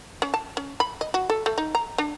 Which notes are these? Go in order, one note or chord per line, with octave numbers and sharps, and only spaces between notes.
C#4
A5
C#4
B5
D#5
F#4
A4
A3
D#4
A#5
D4